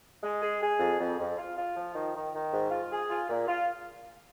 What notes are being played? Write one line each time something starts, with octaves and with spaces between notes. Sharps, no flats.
G#3
G#4
G#4
F2
F2
F2
F4
F4
F3
D#3
D#3
D#3
G#2
F4
G#4
F4
A#2
F4